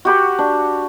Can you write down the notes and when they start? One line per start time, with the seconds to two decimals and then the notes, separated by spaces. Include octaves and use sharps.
0.05 F#4 G4 B4
0.38 D4